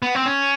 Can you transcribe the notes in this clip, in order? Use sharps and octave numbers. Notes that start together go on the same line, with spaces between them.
B3
C4
C#4